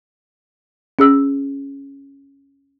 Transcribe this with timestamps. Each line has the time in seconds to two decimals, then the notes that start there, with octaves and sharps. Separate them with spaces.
0.99 C#4 G#4 E6